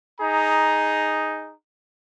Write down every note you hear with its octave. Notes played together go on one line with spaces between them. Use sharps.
D#4 G#4 A#5